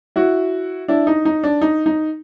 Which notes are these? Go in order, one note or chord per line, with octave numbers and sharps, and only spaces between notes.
E4 F#4
D4 E4
D#4
D#4
D4
D#4
D#4